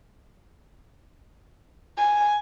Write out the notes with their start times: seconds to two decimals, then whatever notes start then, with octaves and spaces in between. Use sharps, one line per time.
1.97 G#5